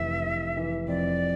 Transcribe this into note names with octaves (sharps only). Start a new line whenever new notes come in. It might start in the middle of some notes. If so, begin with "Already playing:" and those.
Already playing: F1 E3 E5
E3
E3
F2 D5